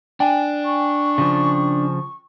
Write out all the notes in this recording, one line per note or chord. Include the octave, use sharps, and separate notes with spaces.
D4 G5 G#5
C#6
C#3 F3